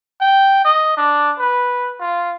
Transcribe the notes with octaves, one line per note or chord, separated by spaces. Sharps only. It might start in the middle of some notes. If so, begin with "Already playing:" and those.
G5
D#5
D4
B4
F4